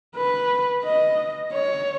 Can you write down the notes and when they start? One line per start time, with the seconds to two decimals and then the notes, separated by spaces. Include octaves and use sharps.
0.16 B4
0.85 D#5
1.53 C#5